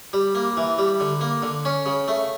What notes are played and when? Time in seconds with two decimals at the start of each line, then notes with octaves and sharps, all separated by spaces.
0.13 G3
0.35 A#3
0.57 E3
0.78 G3
1.00 D3
1.21 A#3
1.42 D3
1.65 C#4
1.86 C#3
2.08 A3